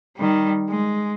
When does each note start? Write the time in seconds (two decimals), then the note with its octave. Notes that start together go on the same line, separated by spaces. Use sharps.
0.17 D#3 G3
0.69 G#3